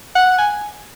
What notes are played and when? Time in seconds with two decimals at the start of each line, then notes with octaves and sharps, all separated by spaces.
0.15 F#5
0.38 G#5